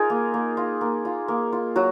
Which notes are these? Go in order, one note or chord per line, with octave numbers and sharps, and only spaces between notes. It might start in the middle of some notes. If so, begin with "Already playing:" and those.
Already playing: D#4 F4 G#4 A#4
A#3
A#3
F4
A#3
F4
A#3
F4
F#3 F#4